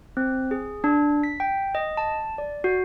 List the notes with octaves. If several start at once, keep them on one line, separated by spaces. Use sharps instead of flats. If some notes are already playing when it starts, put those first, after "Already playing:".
C4
G#4
D4
B6
G5
D#5
A5
D5
F#4